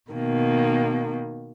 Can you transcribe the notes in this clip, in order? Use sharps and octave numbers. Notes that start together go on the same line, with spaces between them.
B2 D#3 A#3